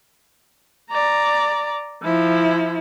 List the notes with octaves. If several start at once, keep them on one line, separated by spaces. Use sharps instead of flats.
D5 A#5
F3 E4